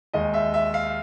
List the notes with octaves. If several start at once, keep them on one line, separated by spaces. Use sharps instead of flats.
D#2 D#3 G#3 D#5
E5
E5
F5